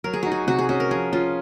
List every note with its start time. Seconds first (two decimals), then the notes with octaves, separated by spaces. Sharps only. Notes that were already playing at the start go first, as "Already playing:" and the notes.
0.04 F#3 A#4
0.13 G#4
0.23 D#4 F#4
0.32 G#4
0.47 C3 F#4
0.59 G#4
0.69 C#4 F#4
0.80 A#4
0.91 F3 G#4
1.13 C#4 F4